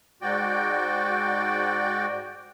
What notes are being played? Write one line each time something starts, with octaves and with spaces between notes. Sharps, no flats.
G#2 F#4 D5 G5